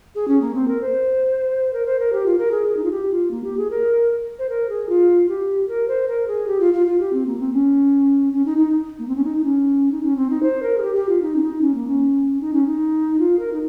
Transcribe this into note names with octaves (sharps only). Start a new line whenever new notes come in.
G#4
C#4
A#3
C4
A#4
C5
A#4
C5
A#4
G4
F4
A#4
G#4
D#4
F4
G4
F4
A#3
G4
G#4
A#4
C5
A#4
G#4
F4
G4
A#4
C5
A#4
G#4
G4
F4
F4
F4
G4
C4
A#3
C4
C#4
C#4
D#4
D#4
A#3
C4
C#4
D#4
D#4
C#4
D#4
C#4
C4
D#4
C5
A#4
G#4
G4
G4
F4
D#4
C#4
D#4
C#4
A#3
C#4
D#4
C#4
D#4
F4
A#4
D#4